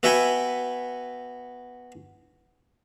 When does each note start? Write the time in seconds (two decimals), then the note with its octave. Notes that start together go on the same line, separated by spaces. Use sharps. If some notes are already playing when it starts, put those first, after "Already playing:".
0.03 B3 F#4 E5 G5 G#5 B5